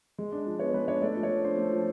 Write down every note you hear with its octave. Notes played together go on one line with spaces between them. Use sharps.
G#3
D4
F3
B3 C#5
G#3 B4
D4 C#5
A3 D5
F3
C#5
F3
D4 C5
A3
F3